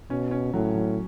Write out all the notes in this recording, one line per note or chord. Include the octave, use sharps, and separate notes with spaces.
B2 C#4
C#4
A2 F#3
F#3